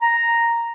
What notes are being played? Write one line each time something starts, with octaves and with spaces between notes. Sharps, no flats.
A#5